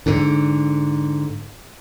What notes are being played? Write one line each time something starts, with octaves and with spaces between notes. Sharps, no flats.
G#2 D3